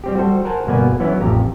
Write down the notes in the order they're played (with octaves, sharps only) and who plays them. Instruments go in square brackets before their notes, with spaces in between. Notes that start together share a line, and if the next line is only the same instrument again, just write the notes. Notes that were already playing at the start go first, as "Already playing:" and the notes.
[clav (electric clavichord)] G3 C4 G4
G3 F#4 A4 C5
A#4 C5 F#5 G#5 A5
G1 B2 A#3 B3 D5 G#5
E3 F#3 B3 C#4 E4
A1 F2 G4 A#5